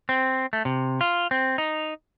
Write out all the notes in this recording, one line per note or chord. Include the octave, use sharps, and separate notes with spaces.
C4
A3
C3
F4
C4
D#4